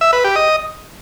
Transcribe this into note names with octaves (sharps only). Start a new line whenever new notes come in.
E5
B4
G4
D#5